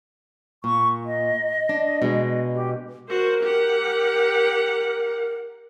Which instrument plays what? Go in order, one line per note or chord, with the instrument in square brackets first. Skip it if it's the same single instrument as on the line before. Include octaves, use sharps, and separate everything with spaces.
[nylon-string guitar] A#2 [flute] C#6
[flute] D#5
[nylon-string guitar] D4
B2 G#3
[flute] G4
[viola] F#4 C5 [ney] A#4
[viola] G4 F#5